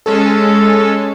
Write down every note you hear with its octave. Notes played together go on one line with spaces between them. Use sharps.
G#3 C#4 A4